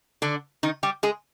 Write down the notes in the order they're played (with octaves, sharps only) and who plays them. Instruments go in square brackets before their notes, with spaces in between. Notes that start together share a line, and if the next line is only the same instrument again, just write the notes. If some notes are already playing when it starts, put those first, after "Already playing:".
[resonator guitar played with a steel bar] D3 D4
D#3 D#4
G3 G4
G#3 G#4